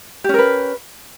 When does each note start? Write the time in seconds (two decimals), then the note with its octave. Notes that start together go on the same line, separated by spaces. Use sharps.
0.24 G4
0.29 C#4
0.34 A#4
0.39 B4